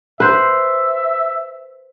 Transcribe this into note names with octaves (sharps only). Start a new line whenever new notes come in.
B4 C5 E5